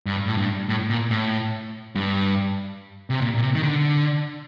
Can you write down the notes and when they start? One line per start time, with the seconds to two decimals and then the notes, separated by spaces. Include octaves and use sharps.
0.06 G2
0.27 A2
0.37 G2
0.69 A2
0.90 A#2
1.11 A2
1.95 G2
3.10 C3
3.21 A#2
3.37 A#2
3.42 C3
3.55 D#3
3.63 D3